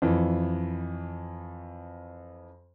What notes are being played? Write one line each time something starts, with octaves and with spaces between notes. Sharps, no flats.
F2 E3